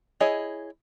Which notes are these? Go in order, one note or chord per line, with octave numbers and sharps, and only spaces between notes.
E4 G#4 C#5 D#5